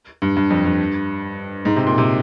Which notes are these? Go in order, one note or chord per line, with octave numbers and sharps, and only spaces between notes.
G2
G2
F2
G2
G#2
C3
A#2
C3